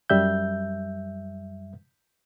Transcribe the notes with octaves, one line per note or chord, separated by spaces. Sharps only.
F#2 G3 E5 G6